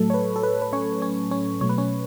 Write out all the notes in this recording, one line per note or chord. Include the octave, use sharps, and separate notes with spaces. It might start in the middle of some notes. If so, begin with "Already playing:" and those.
Already playing: A2 F#3 A3 A4
C#5
B4
A4
B4
B4
C#4 C#5
C#4 C#5
C#4 C#5
B2 F#3 A3 C#5
B4
C#4 C#5